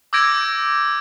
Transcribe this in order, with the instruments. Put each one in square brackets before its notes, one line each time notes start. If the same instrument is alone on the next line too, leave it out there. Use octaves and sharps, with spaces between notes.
[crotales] D6 E6 G6 G#6 A#6 D7